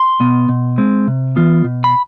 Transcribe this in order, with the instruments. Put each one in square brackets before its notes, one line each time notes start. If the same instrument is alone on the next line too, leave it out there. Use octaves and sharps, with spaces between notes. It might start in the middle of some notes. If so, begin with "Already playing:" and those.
Already playing: [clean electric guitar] C6
B2 B3
B2
G#3 C4
C3
E3 B3 F4
B2
B5